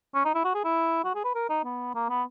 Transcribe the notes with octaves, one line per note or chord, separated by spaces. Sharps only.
C#4
D#4
E4
F#4
G#4
E4
F#4
G#4
B4
A#4
D#4
B3
A#3
B3